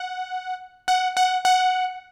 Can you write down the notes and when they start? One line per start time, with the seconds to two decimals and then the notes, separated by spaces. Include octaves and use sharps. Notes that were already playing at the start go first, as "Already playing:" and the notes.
Already playing: F#5
0.88 F#5
1.17 F#5
1.45 F#5